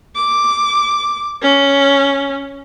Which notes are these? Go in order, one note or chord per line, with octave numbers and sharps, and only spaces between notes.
D6
C#4